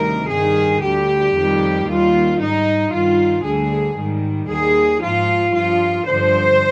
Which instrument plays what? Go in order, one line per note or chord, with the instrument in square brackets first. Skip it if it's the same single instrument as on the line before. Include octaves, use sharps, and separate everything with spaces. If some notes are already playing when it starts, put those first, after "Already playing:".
Already playing: [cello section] D2 C3 D#3 G3 A#4
G2 D#3 G3 G#4
D2 D3 G3 G4
F2 D#3 G3
D#2 D#3 G3 F4
G#2 G3 D#4
G2 D#3 G3 F4
D2 D3 G3 G#4
G#2 D#3 G3
D#2 D#3 G3 G#4
G#2 F3 F4
G2 F3 F4
G2 D3 F3 C5